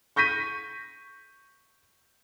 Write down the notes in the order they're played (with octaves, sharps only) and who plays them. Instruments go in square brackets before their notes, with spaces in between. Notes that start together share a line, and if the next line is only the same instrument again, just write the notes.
[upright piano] C#6 G6 A#6 B6 D#7